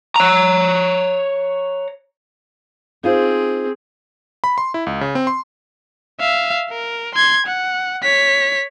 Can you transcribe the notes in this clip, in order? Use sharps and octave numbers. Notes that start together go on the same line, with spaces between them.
C#5 A#5
C4 D#4 F4 G#4 C5
B5
C6
E4
C#2
C#3
C4
C6
E5 F5
A#4
C6 G#6
F#5
C#5 B6